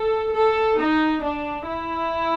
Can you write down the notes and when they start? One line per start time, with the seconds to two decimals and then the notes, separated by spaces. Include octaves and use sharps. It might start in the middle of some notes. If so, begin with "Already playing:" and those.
Already playing: A4
0.35 A4
0.80 D#4
1.23 D4
1.68 E4